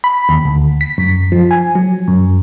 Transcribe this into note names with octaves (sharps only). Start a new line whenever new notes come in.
B5
D#2
D2
B6
F#2
F3
G#5
F#3
F#2